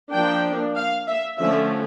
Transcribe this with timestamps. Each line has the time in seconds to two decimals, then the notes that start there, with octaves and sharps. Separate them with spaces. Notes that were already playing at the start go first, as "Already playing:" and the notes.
0.12 F3 A#3 D4 G5
0.76 F5
1.08 E5
1.39 D3 F3 A3 C#4 E5